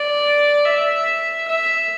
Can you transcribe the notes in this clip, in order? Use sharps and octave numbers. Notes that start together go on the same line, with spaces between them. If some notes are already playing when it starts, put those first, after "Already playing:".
Already playing: D5
E5
E5